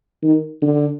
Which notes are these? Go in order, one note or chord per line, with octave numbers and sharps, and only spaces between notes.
D#3
D3